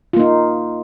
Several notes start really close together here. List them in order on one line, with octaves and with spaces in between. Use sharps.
F4 A#3 D#4